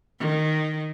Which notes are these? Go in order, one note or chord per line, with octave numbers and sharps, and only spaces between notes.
D#3